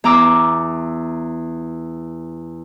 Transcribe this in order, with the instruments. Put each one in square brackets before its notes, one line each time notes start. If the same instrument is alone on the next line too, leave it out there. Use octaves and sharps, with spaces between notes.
[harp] E2 A#5 D6 E6